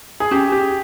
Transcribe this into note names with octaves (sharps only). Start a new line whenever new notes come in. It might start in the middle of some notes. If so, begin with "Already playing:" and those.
G#4
C#4 G4
G4